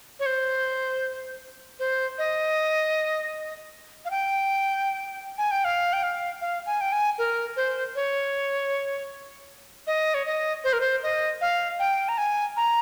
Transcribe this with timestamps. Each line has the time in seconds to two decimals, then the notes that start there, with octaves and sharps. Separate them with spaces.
0.20 C#5
0.26 C5
1.79 C5
2.18 D#5
4.05 F5
4.11 G5
5.38 G#5
5.51 G5
5.65 F5
5.93 G5
6.03 F5
6.41 F5
6.66 G#5
6.81 G5
6.92 G#5
7.18 A#4
7.56 C5
7.95 C#5
9.87 D#5
10.14 C#5
10.26 D#5
10.64 C5
10.73 A#4
10.81 C5
11.03 D#5
11.41 F5
11.79 G5
12.09 A#5
12.18 G#5
12.57 A#5